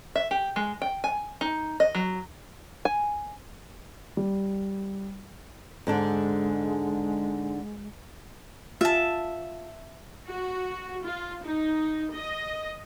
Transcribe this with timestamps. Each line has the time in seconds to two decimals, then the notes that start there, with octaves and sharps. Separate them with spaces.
0.15 E5
0.31 G4
0.56 G#3
0.82 G5
1.04 G#5
1.41 D#4
1.80 D#5
1.95 F#3
2.85 G#5
4.17 G3
5.87 G#2 D3 G#3 D4
8.81 F4 E5 A5
10.26 F#4
11.04 F4
11.44 D#4
12.14 D#5